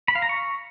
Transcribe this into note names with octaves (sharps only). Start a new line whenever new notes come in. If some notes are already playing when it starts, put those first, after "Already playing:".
B5
F5
A#5
C#6